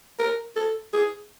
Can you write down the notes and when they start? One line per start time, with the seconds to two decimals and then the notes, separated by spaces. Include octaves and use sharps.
0.19 A#4
0.56 A4
0.93 G#4